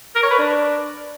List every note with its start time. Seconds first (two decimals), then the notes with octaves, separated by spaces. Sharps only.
0.15 A#4
0.23 C#5
0.31 B4
0.38 D4